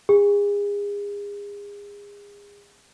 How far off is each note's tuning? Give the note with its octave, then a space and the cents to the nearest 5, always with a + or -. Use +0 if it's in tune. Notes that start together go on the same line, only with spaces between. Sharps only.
G#4 -35